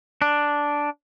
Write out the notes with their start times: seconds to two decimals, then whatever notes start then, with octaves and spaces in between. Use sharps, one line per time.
0.22 D4